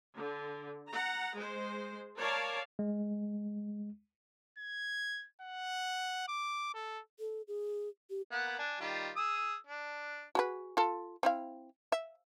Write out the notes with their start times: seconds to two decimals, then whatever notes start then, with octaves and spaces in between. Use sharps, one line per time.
0.16 D3
0.89 F#5 A#5
1.36 G#3 C5
2.18 A#4 C#5 D5 F5 A5
2.79 G#3
4.59 G#6
5.42 F#5
6.28 D6
6.74 A4
7.19 A4
7.48 G#4
8.10 G4
8.31 A#3 B3 F#5
8.59 D4 G#5
8.80 D#3 G3 F4
9.16 G#4 D#6 E6
9.67 D4
10.35 F#4 G#4 B4
10.77 F4 A4
11.23 C4 E4 F5
11.92 E5